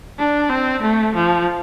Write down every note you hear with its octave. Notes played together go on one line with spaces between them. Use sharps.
D4
C4
A3
F3